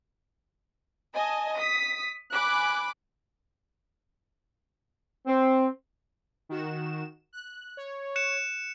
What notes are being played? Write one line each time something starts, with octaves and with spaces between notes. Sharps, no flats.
D#5 G#5 A5
D#6 B6
G#5 B5 D6 F#6
C4
D#3 F#4 E7
F#6
C#5
F#6 C#7 E7